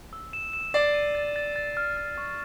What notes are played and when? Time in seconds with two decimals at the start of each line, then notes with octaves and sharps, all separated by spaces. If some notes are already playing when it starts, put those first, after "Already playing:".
0.13 E6
0.33 E7
0.53 E7
0.74 D5 C7
0.94 D#7
1.15 A6
1.36 A6
1.56 A6
1.77 F6
1.97 F6
2.18 C#6